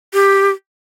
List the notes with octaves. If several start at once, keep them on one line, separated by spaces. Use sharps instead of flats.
G4